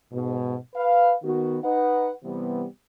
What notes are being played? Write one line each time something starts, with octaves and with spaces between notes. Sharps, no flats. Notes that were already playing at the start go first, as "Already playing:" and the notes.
G#2 B2
B4 F5
D#3 B3 F#4
D#4 B4 F#5
C3 E3 G3 B3